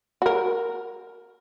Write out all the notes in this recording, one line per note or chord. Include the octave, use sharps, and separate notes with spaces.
F#4 A#4